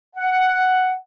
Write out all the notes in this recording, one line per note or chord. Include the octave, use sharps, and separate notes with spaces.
F#5